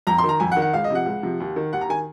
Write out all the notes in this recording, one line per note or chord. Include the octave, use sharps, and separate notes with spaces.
F2 A#5
C6
D#3
A#5
F2 G#5
F#5
D#3
F#5
C#2 F5
D#5
C3 F3 F#5
C#2
C3 F3
D#2
D#3
D#2 F#5
A#5
D#3 G#5